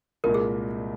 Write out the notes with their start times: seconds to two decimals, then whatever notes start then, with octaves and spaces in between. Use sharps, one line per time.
0.24 C2 A#2 G#3 A#4
0.34 G#4